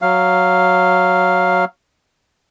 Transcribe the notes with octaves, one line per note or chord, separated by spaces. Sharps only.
F#3 F5